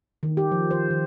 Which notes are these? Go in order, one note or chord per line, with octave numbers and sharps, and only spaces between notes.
D#3
G4
F3
C5
D#3